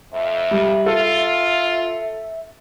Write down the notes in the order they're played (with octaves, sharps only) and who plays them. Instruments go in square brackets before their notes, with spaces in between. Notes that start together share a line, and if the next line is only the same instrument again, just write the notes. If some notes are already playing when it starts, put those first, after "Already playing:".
[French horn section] F2 [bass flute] E5
[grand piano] G3
[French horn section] F4 [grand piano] A4